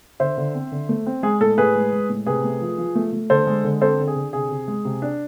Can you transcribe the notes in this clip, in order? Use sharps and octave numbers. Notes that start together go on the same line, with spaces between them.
D3 C5 E5
D3
C4
D3
A3
C4
G#3 G#4
A2 A4
A2 G#4 B4
G#3
G#3
A2
C3 G#4 B4
A3
F3
F3
A3
A3
D3 A4 C5
G#3
D3
C4 A4 C5
D3
G#4
D3
C3 G#4
C3
G#3
C3
D4